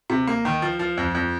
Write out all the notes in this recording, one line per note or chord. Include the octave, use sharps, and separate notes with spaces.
C3
A#3
D#3
F3
F3
F2
F2